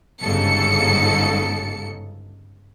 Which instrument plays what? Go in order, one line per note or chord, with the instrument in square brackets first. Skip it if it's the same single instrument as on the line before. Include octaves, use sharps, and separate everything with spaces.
[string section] G1 G#2 C#3 A4 C#7